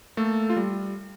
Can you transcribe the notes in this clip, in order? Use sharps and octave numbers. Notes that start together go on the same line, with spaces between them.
A3 A#3 A4
F4
G3